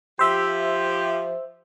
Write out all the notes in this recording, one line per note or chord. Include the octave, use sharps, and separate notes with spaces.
F3 G4 C5 E5